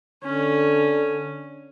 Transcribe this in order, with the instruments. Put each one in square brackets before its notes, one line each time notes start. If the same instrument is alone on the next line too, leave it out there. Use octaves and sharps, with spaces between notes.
[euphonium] D3 [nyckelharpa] C#4